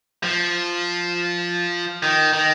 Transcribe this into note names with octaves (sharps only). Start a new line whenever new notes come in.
F3
D#3
D#3